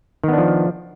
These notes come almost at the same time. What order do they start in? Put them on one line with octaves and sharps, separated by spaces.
D#3 B3 D4 F3